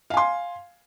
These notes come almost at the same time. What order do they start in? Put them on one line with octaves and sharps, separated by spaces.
F5 G#5 C6